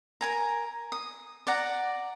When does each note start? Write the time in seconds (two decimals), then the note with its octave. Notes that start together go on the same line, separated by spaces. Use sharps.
0.21 A#4 G#5 A#5
0.92 D#6
1.47 D5 F#5 A#5